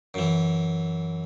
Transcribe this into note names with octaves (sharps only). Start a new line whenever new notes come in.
F#2 E3